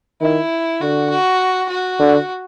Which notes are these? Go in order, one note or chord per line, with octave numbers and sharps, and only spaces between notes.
D#3 E4
D3 F#4
F#4
F#4
D3